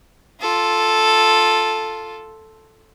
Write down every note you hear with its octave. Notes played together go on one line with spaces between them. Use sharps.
F4 A4